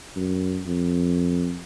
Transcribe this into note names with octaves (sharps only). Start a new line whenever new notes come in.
F#2
F2